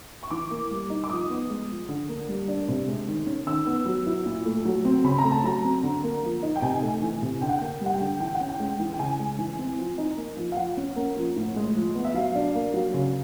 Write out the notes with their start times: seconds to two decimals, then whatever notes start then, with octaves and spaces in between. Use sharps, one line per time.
0.23 C#6
0.31 E3 D6
0.51 A#3
0.71 G3
0.90 D#4
1.04 D6
1.10 F3 D#6
1.30 B3
1.50 G#3
1.69 F3
1.89 D3
2.09 A#3
2.29 G3
2.48 D4
2.68 C3
2.88 G#3
3.08 D#3
3.26 C#4
3.47 D#3 E6
3.67 B3
3.86 F#3
4.06 E4
4.26 A#2
4.45 A3
4.65 F#3
4.85 C4
5.04 C#3 B5
5.18 A#5
5.24 A3
5.32 A5
5.44 F#3 A#5
5.64 C4
5.83 D3
6.03 A#3
6.23 F3
6.43 D#4
6.56 G5
6.62 C3 G#5
6.82 A3
7.02 E3
7.22 C3
7.41 D3 G5
7.49 F#5
7.58 G5
7.61 A#3
7.81 G3
7.86 F#5
7.94 G5
8.01 D3
8.20 E3 G5
8.35 F#5
8.40 C#4
8.48 G5
8.60 G#3
8.79 E3
8.93 G5
8.99 C#3 G#5
9.20 G#3
9.39 E3
9.59 C4
9.78 F3
9.98 D#4
10.17 A#3
10.37 F3
10.52 F5
10.57 F3 F#5
10.77 C#4
10.96 A#3
11.16 F3
11.36 A2
11.56 G#3
11.75 F3
11.95 B3
12.05 E5
12.14 F#3 F5
12.35 D4
12.55 A#3
12.74 F#3
12.94 C#3